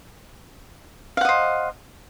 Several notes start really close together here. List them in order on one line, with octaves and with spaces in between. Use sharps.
F5 F#5 D#5 C5